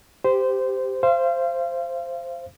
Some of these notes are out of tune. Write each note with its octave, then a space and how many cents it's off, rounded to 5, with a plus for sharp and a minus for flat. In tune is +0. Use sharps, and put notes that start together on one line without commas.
G4 +0 C5 -20
C5 +0 F5 -35